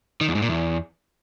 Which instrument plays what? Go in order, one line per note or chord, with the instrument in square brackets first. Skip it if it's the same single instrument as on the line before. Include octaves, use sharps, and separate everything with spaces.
[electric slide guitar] D#3
E2
G#2
A#2
E2